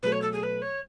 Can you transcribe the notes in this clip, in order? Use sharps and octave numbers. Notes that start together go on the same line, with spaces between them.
B2 F#3 A3 B4
C#5
A4
G#4
B4
C#5